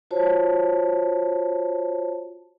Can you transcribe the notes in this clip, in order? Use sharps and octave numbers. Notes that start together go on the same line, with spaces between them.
F4 F#4 C5 C#5 A5